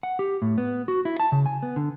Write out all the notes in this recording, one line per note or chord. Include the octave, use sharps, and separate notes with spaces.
F#5
G4
A2
B3
F#4
E4
A5
C#3
G#5
B3
D3